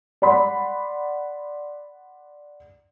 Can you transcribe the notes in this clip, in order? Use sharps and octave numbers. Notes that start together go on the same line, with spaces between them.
D5 F#5 B5 C6